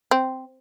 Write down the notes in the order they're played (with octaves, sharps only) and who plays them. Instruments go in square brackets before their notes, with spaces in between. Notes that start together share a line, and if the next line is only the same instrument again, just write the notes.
[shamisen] C4